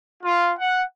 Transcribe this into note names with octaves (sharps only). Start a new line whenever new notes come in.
F4
F#5